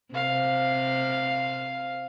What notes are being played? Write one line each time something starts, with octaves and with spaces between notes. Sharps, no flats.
C3 F5